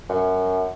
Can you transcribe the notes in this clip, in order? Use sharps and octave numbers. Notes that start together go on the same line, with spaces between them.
F#2